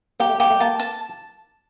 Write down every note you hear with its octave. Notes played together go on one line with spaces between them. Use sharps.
A#3 G4
A3
A#3 G4
A3
A#3 A5
A5